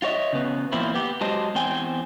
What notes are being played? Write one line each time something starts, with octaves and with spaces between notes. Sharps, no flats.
F4 F#4 C#5 D#5 E5
C#3 B3
E2 A#2 F3 A#3 C4 E4
B3 G4
F#3 G#3 G4 C5 D#5 A5
E2 C4 G5 G#5